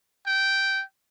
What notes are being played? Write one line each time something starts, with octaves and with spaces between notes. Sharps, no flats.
G5